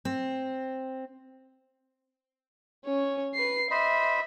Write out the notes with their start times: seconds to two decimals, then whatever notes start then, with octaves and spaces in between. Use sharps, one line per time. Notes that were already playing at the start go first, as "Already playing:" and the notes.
0.05 C4
2.85 C#4 C#5
3.35 B4 C7
3.71 C5 D#5 E5 B5